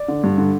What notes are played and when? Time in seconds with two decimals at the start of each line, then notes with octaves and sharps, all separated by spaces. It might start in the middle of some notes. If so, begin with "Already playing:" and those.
Already playing: D5
0.08 D3
0.23 G2
0.38 D3